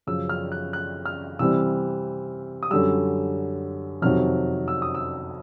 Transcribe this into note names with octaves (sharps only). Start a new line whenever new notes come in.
F#2 C#3 F3 E6
F6
F#6
F#6
F6
C3 E3 G3 C4 E6
D#6
F#2 D3 G3 E6
F2 C3 D#3 F#3 F6
E6
D#6
E6